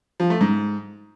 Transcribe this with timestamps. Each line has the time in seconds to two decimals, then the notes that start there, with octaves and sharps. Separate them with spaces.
0.20 F3
0.30 A3
0.41 G#2